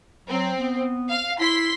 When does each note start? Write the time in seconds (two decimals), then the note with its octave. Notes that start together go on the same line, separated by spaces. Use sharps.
0.28 F#3 C4
0.59 B3
1.09 F5
1.40 E4 C6 B6